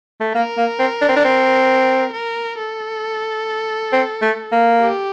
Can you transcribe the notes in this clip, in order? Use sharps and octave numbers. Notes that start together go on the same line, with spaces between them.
A3
A#3 A#4
A#3
C4
D4
C4
D4
C4
A#4
A4
C4
A3
A#3
G4